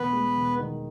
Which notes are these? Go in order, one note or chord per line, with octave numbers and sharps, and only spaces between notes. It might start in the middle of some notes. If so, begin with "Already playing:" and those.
Already playing: E1 B3 B4
G#3
E1
D#3